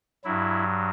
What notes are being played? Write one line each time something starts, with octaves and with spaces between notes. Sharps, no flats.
G2 F#3 E4